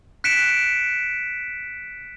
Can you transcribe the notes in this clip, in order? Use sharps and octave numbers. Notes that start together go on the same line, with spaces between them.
F#6 B6 C#7 D7 E7